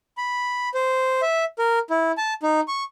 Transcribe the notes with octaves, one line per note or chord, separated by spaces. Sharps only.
B5
C5
E5
A#4
E4
A5
D#4
C#6